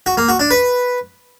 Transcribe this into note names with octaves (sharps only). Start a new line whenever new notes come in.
F#4
A#3
F#4
D4
B4